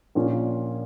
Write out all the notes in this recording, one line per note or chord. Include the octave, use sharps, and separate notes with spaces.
A#1 A#2 A#3 C#4